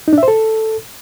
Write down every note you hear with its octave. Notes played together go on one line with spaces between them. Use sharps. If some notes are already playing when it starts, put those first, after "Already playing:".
D#4
D4
E5
C5
A4